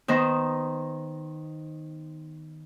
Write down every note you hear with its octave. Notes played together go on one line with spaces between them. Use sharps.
D#3 B3 C5 A#5